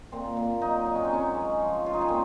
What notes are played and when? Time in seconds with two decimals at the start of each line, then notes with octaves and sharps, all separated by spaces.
0.12 A#2 C4
0.37 A#2
0.61 F#3 D#4
0.86 F#3 D#4
0.95 C#4
1.05 C4
1.10 C#3 C#4
1.35 G#3
1.60 F3
1.84 C#3 F4
1.93 D#4
2.01 C#4
2.08 A#2 C4